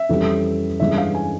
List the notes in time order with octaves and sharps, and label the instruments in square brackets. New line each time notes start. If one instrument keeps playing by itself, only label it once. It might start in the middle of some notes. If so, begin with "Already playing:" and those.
Already playing: [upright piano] E5
[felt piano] F2 E3 G3 C#4 G4
[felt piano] G2 E3 G#3 C#4 [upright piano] E5
[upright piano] F5
G#5